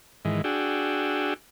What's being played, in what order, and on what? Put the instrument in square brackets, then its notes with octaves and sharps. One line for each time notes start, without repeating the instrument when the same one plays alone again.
[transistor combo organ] G#2 D#3 E3
D4 F#4 G#4 G5 E6